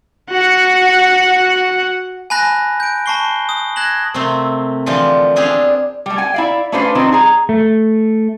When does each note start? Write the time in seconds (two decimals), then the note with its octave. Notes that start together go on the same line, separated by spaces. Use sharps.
0.31 F#4 F#5
2.30 G#5 A5 B5 F#6 A#6
2.80 G6 D7
3.06 A5 B5 C#6 C7 G7
3.49 D#6
3.76 F#6 G#6 A#6 E7 F#7
4.14 C3 A3 A#3 C4
4.86 D3 E3 F3 F4 G4
5.36 B3 C4 D4 G4 G#4 F5
6.06 G3 A3
6.18 G5 G#5
6.34 E4 D5 F5
6.72 A3 C#4 D4 B4 C5 F5
6.95 D#3 F3 C4 D4 D#4
7.12 G#4 A#5
7.49 A3